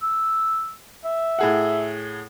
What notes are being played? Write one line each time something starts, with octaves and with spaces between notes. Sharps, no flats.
E6
E5
A2 G#4 F#5